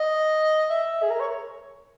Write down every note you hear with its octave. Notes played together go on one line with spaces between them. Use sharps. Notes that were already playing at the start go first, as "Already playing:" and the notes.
Already playing: D#5
E5
G#4
A#4
C#5